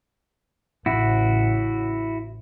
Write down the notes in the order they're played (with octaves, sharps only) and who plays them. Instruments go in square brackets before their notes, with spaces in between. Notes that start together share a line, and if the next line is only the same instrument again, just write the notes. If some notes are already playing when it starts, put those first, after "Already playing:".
[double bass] A1 C#3 [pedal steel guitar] E4 F#4